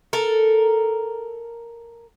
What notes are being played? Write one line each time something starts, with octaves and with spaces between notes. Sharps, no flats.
A4 A#4